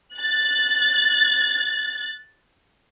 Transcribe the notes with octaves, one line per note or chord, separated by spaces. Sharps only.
F#6 A6